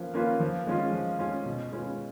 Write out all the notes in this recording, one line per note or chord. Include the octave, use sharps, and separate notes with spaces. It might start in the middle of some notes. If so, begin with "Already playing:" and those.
Already playing: F3 A#3 C#4 F4 B4
A#3 C#4 F4 B4
F3
G#3 C#4 F4
F3
G#3 C#4 F4
B2
G#3 C#4 F4 B4